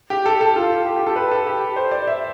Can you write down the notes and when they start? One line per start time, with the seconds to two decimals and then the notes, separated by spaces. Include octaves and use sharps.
0.10 G4
0.26 A4
0.41 A4
0.56 F4
0.86 G4
0.96 G4
1.07 A4
1.16 B4
1.31 A4
1.47 G4
1.76 C5
1.91 D5
2.07 E5